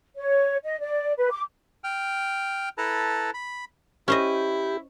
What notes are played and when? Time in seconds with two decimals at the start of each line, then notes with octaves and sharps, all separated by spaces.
0.17 C#5
0.64 D#5
0.80 D5
1.18 B4
1.31 D6
1.84 G5 F6
2.78 E4 A4 B4 A5 A#5
3.34 B5
4.08 C#4 E4 G4 C5 D#5